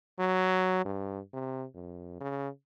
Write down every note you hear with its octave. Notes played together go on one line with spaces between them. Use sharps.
F#3
G2
C3
F2
C#3